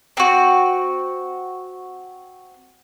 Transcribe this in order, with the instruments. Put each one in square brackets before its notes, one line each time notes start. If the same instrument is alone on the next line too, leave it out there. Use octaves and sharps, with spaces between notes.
[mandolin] C4 F#4